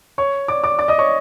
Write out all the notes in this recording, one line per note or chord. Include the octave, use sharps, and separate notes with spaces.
C#5 C#6
D5 D6
D5 D6
D5 D6
D#5 D#6
C#5 C#6